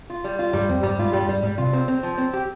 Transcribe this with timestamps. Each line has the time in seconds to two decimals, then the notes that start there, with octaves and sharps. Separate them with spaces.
0.10 F4
0.24 G3
0.39 F4
0.53 G2 G3
0.69 F2 C4
0.83 G2 G3
0.99 G#2 F4
1.13 G2 G3
1.28 G2 G3
1.43 G#2 G3
1.58 C3 F4
1.73 C4
1.88 C4
2.03 F3
2.18 C4
2.33 G4